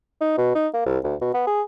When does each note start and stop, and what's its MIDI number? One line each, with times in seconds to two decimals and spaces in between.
0.21 0.35 63
0.38 0.54 47
0.55 0.68 63
0.74 0.84 58
0.86 0.98 36
1.04 1.15 38
1.21 1.34 47
1.34 1.46 59
1.47 1.62 68